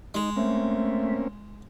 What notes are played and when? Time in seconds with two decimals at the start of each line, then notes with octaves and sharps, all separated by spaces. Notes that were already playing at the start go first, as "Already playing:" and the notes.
0.14 G#3 D#4
0.36 A3 A#3 C4 C#4